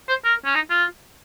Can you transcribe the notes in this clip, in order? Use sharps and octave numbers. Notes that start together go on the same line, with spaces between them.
C5
A#4
C#4
D#4
F4